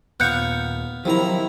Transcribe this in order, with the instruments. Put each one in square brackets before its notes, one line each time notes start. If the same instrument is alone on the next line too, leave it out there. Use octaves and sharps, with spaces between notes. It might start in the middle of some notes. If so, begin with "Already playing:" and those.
[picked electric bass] D#2 A#2 [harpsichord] B3 F5 C#6 [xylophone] F#6 G6 C#7
[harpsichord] C3 D#3 A#5 [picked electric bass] F3 F#3 [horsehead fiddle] E4